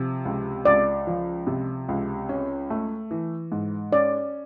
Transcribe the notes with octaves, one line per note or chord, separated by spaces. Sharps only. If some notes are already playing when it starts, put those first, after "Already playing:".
Already playing: C3 F3
C#2
C#2 D5
F3
C3
C#2
C#4
A3
E3
G#2
C#4 D5